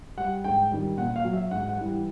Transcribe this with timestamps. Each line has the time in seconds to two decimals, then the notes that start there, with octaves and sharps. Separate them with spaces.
0.17 G3 F#5
0.44 G#2 G5
0.71 D#3 G3
0.98 A#2 F#5
1.16 F5
1.25 F#3
1.33 E5
1.51 G#2 F#5
1.69 F#5
1.78 E3 G3